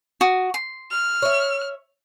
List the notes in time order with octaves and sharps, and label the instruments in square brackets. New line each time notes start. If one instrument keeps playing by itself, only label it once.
[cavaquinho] F#4 D#6
C6
[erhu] F6
[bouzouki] C#5 E5